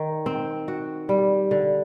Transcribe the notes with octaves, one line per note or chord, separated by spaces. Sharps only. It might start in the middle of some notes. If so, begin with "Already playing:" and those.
Already playing: D#3
C4
F#4
G3
D3